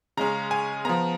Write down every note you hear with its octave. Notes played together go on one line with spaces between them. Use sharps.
C#3 G#3 C#4 A#5
G#5
F3 B3 A#5